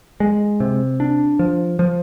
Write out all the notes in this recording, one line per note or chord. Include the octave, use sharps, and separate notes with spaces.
G#3
C3
D4
F3
F3